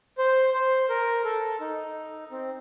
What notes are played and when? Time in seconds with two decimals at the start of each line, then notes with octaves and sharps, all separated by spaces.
0.18 C5
0.54 C5
0.89 A#4
1.24 A4
1.61 D#4
2.31 C4